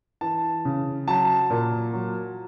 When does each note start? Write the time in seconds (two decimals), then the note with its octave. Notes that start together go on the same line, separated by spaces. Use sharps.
0.21 E3 A5
0.65 C#3
1.08 F#3 A5
1.50 A#2
1.93 F#3